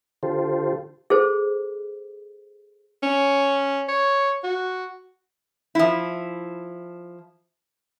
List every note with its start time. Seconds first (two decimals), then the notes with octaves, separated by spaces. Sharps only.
0.23 D3 F4 G4 A4 C5
1.10 G#4 A4 C5
3.03 C#4
3.89 C#5
4.44 F#4
5.75 F3 E4